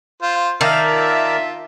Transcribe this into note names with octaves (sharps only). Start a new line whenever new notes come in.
F4 C5
D#3 A#4 D5 E5 F5 A5
F4